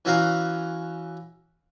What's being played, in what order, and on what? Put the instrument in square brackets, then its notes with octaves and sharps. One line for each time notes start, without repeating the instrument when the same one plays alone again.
[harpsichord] E3 C#4 F#4 F5 A#5